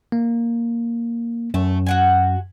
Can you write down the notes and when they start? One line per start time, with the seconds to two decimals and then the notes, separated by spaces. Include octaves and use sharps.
0.12 A#3
1.54 F#2 A3
1.86 F#4 F#5 G#5